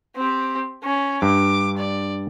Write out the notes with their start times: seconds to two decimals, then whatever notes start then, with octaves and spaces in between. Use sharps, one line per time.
0.16 C4 G4
0.83 C#4
1.22 G2 D6
1.78 D5